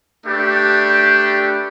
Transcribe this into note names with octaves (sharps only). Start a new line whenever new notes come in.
A3 D4 G4 B4